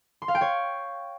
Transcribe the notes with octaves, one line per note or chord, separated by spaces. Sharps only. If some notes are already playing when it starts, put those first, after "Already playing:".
C6
F5
G5
C#5